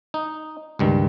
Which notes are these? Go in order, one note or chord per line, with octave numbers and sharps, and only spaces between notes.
D#4
C#2 G2 D#3